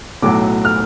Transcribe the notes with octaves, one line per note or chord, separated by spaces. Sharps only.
B1 A2 F#3 D6
F6